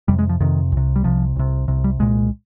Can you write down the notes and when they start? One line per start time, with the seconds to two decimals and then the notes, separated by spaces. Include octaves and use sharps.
0.08 F2 C3 G3
0.19 G#3
0.29 F3
0.40 F2 C3 D#3
0.72 C2 C3
0.96 G3
1.04 C2 C3 F3
1.36 C2 C3
1.68 C2 C3
1.84 G3
1.99 C2 A#2 G#3